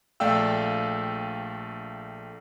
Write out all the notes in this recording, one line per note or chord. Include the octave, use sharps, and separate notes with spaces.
A#1 A3 D5 F5 G5 E6